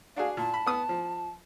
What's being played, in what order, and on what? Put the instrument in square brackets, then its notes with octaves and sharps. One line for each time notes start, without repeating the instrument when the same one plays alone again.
[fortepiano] D4 F#4 G#4 [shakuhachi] F5
[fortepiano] A#2 [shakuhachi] A5
[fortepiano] B5
B3 D#6
F3